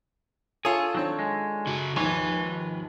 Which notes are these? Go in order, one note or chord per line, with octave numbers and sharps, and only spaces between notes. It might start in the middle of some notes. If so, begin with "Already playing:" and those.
F4 G#4 A4 C#5
D#3 F#3 C4 D4 C#5
G#3
C#3 F#4
G#1 D#2 F3 B4 C#5 G#5